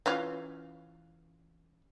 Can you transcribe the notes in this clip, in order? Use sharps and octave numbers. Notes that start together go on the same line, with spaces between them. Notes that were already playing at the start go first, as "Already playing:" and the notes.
E3 C#4 F4